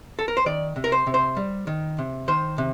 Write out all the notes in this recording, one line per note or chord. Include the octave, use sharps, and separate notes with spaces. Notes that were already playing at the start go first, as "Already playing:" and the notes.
A4
A#4
C5
D#3 D5
C3
A#4
C5
C3
C5
G3
D#3
C3
D#3 C5
C3